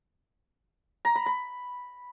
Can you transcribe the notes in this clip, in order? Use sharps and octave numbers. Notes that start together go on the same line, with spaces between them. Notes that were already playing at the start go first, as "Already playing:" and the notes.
A#5
B5
B5